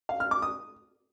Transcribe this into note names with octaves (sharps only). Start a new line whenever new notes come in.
F5
F6
D6
D#6